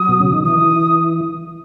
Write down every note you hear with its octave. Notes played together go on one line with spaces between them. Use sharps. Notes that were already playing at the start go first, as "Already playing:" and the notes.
Already playing: F#3 D#6
B2
C#3
D#3
E3 D#6